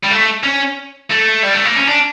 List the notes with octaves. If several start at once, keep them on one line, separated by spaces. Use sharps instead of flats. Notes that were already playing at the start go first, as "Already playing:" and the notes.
G3
A3
C#4
A3
G3
A3
A#3
C#4
D4